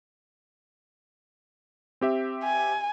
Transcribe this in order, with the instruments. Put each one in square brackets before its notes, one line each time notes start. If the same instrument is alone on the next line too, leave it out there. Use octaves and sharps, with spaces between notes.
[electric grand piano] C4 G4 E5
[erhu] G#5